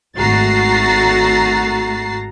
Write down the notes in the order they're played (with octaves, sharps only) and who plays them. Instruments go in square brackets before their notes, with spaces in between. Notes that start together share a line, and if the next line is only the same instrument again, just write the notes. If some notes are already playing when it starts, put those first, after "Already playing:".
[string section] G#1 A3 F#4 A#5 A6 C7